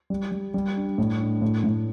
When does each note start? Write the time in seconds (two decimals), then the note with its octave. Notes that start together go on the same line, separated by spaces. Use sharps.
0.10 G3
0.32 G3
0.54 G3
0.76 D4
0.98 A2
1.20 D4
1.42 A2
1.64 A2